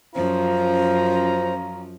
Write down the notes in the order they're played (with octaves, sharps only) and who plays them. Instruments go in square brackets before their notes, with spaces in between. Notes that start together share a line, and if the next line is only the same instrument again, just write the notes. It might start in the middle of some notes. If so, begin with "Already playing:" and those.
[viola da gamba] F#2 F3 [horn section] C#4 F4 A#5 [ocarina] C5